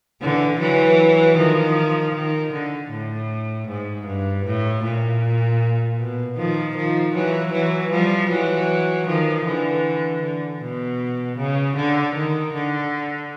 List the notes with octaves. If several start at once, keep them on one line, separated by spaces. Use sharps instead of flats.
D3 E3
E3 F#3
D#3 F3
D#3
D3
A2
G#2
G2
A2
A#2
B2
D#3 F3
D#3 F3
E3 F#3
E3 F#3
F3 G3
E3 F#3
D#3 F3
D3 E3
D3
B2
C#3
D3
D#3
D3